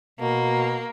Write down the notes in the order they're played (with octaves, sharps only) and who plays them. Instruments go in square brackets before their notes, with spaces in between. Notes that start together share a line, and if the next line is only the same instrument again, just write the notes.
[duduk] B2 [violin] A#3